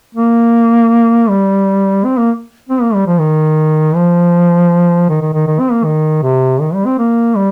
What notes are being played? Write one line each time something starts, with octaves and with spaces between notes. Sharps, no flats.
A#3
G3
C4
A#3
C4
A#3
G3
F3
D#3
F3
D#3
D#3
D#3
D#3
C4
A#3
D#3
C3
D#3
G3
C4
A#3
G3